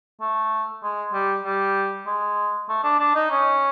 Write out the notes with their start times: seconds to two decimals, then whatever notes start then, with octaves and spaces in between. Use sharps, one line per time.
0.21 A3
0.83 G#3
1.13 G3
1.44 G3
2.06 G#3
2.69 A3
2.83 D4
2.99 D4
3.15 D#4
3.30 C#4